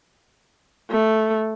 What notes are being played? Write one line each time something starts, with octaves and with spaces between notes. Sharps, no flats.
A3